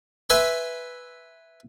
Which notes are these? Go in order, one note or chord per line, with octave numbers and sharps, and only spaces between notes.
B4 E5 G#5 B5 C6